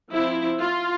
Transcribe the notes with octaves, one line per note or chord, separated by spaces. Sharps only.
F3 C4 E4
F4